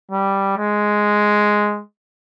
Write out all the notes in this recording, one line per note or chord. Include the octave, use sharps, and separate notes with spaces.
G3
G#3